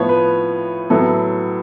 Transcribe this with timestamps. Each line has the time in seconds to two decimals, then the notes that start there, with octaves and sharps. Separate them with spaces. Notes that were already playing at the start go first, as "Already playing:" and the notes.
Already playing: A2 F3 B3 C#5
0.09 B4
0.90 A2 F#3 B3 A4